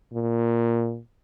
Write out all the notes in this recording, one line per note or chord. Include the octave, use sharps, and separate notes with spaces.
A#2